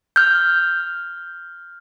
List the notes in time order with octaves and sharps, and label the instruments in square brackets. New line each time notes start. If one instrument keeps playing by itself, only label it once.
[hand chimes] F6 G6